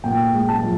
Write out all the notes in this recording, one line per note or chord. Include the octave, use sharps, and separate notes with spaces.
A#2 G5
G#3
A5
F3